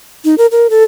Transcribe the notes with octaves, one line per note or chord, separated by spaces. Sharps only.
D#4
A#4
A#4
A4